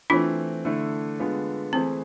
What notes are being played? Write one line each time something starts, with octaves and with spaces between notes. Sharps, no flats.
E3 A3 C4 D4 F4
D3 A3 E4
D3 G#3 B3 F4
E3 A3 C4 E4 G#4 C5